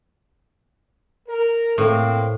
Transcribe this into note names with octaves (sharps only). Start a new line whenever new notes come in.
A#4
A2 A#3 C4